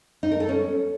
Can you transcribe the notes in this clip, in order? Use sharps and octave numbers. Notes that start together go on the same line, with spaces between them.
D#4
A#4
A4
C#4